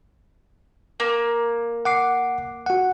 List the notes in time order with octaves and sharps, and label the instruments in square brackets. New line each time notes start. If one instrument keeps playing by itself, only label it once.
[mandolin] A#3
[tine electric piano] F#5 D6 C7
F#4 F#5